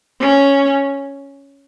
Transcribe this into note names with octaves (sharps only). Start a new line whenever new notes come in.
C#4